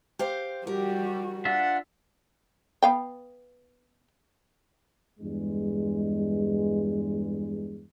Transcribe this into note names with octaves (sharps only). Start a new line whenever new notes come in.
G4 C5 F5
G3 F#4 G4 A#4
D4 F4 E5 F#5
B3 F5 G5
E2 G2 G#3